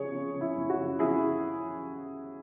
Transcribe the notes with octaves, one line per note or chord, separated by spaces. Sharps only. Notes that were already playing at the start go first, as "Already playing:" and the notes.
Already playing: C#3 G#3 G#4 C#5
C#3
C#3
E4
F#2
F#4
C#3
C#3 E4 G#4